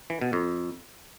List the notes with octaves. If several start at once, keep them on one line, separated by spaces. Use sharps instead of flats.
E3
B2
F2